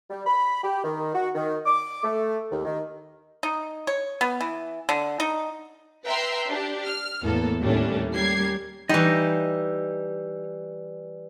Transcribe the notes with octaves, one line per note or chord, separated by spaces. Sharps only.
G3
B5
G4
D#3
F#4
D#3
D6
A3
D#2
D#3
D#4
C#5
B3
E3
D3
D#4
B4 E5 G5 A#5 C6
D4 G4
F6
E2 A2 A#3 B3 A4
D#2 A2 G3 A3 C#4 D4
G3 C#4 G4 A#4 G#6 C7
E3 G3 D#4 D#5